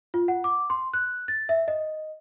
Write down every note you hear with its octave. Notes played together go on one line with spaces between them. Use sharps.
F4
F#5
D6
C6
F#6
A6
E5
D#5